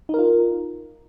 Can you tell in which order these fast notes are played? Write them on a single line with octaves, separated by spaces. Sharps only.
D#4 A#4 F4